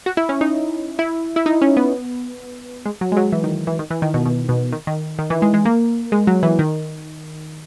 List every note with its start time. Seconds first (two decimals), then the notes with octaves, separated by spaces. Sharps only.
0.06 F#4
0.17 E4
0.29 C#4
0.41 D#4
0.99 E4
1.36 E4
1.46 D#4
1.61 C#4
1.77 B3
2.86 G#3
3.01 F#3
3.12 G#3
3.17 F#3
3.32 E3
3.44 D#3
3.67 E3
3.79 D#3
3.90 E3
4.02 D#3
4.14 B2
4.26 B2
4.49 B2
4.72 D#3
4.87 D#3
5.19 D#3
5.30 E3
5.42 G#3
5.54 G#3
5.65 A#3
6.12 G#3
6.27 F#3
6.43 E3
6.59 D#3